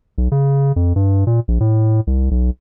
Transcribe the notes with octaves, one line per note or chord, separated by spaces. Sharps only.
B1
C#3
F2
G2
A#2
A#1
A2
C2
B1